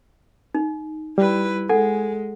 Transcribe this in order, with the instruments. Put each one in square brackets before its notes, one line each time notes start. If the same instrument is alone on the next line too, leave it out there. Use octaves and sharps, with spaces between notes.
[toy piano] D#4
[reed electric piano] G3 [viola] E4 B4
[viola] G#3 [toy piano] A4 F#5 [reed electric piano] G#5